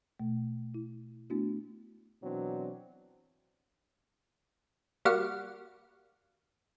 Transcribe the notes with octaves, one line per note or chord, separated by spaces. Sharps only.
B2 A3
E4
A3 B3 D4 E4 F#4
B2 E3 F#3 C4 D4
G3 A#3 F#4 F5 F#5